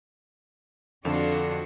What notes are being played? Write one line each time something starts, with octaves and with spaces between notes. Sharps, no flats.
F2 D3 D4 F4 F#4 A4